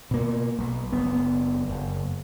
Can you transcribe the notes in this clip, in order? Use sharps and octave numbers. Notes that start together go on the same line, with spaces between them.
B2 A#3
B1
F#1 B3
F#1